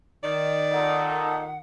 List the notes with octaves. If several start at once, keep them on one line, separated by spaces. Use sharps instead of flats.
D#3 D5
A#2 D#4 A4 F#5